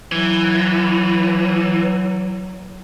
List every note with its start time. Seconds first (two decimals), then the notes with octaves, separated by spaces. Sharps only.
0.12 E3 F#3